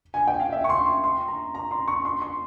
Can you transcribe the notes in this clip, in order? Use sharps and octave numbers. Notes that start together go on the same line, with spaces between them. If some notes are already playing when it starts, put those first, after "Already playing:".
G#5
G5
F5
E5
C#6
C6
C6
C6
A#5
A#5
C6
C#6
C6
C6